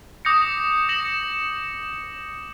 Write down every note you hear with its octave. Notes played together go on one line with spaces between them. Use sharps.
D6 D#6 G6 A#6 C#7
D#6 A#6 C#7 E7 F#7